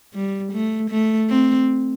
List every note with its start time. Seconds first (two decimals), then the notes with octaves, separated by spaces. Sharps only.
0.14 G3
0.53 A3
0.91 A3
1.30 C4